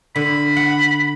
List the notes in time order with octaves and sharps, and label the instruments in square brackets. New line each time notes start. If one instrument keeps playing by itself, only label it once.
[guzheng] D3 [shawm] B5
[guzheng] F#5